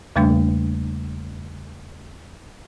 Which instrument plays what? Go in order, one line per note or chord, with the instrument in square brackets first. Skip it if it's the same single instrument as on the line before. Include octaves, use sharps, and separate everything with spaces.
[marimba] E2 C#3 G3 A3 A#3 D4